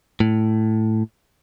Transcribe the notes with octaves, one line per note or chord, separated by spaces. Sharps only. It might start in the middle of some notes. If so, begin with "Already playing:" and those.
A2